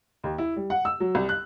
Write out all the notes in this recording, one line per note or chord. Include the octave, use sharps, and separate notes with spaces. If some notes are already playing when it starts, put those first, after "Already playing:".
D#2
E4
G3
F#5
E6
F#3
C2
F#6